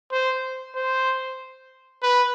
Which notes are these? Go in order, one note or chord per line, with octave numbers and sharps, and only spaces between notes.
C5
C5
B4